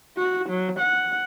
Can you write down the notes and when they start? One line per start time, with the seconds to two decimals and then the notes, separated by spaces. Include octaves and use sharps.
0.17 F#4
0.49 F#3
0.80 F#5